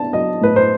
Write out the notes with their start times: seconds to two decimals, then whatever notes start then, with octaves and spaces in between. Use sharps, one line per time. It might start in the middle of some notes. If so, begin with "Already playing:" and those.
Already playing: B3 D4 A5
0.13 F#3 D#5
0.41 A2 B4
0.56 C5